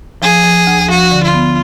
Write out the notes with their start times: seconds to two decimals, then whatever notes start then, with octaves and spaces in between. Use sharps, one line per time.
0.22 F3 G#4
0.44 F3
0.67 D2
0.89 F3 F#4
1.11 D3
1.22 F4
1.34 B3